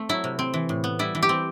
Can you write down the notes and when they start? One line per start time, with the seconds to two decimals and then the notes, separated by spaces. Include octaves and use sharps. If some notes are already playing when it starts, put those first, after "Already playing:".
Already playing: A3 C4
0.09 F#3 E4
0.24 C3
0.39 C4
0.54 E3
0.69 A2
0.84 B3
0.99 G3 E4
1.15 E3
1.22 G4
1.29 C4